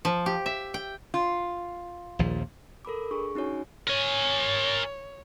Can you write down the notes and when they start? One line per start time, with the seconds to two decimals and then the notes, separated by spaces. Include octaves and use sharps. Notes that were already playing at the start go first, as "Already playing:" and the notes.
0.05 F3
0.26 G4
0.46 E5
0.74 G5
1.14 F4
2.19 A#1 D#2 F3
2.85 A4 A#4 B5 D6
3.11 D4 G#4 C#6
3.35 C#4 D#4 F#4 C#5 G#5
3.88 A#4 C#5 G#5